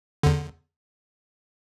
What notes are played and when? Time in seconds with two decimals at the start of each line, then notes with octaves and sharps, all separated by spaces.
0.23 E2 D3